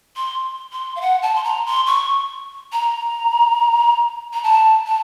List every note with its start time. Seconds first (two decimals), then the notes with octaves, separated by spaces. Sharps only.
0.16 C6
0.72 C6
0.96 F5
1.01 F#5
1.22 A5
1.35 C6
1.44 A#5
1.66 C6
1.86 C#6
2.73 A#5
4.33 A#5
4.43 A5
4.87 A5